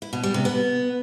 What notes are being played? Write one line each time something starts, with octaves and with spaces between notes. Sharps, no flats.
E4
B2
G3
C3
B3